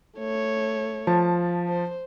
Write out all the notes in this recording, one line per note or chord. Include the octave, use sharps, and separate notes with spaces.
A3 C#5
F3 A5
C5